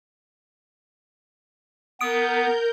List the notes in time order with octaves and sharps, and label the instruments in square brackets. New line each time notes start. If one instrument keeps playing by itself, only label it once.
[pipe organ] B3 [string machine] A#4 G6 [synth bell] D#6 D7